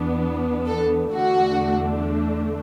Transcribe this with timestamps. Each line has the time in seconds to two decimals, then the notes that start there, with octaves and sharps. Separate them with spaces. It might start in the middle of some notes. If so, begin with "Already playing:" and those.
Already playing: E2 E3 B3 D4
0.67 A4
1.14 E2 D3 A3 D4 F#4